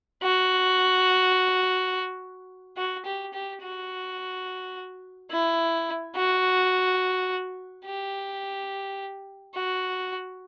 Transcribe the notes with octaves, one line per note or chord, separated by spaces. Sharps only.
F#4
F#4
G4
G4
F#4
E4
F#4
G4
F#4